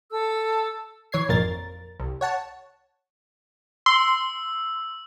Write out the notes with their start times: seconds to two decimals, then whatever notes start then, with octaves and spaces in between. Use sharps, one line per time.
0.11 A4 E6
1.12 E3 C#5 G#6 C7
1.29 G#1 F2 A#2 A#4 A6
2.00 C2
2.21 C#5 F#5 A5
3.86 C6 E6